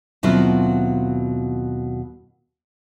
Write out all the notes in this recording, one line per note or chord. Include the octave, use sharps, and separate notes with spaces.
D#2 B2 F#3 C4 E4 F4